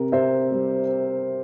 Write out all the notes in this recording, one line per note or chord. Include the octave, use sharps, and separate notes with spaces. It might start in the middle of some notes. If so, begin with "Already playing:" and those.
Already playing: C3 A#4
C3 C5 E5
G3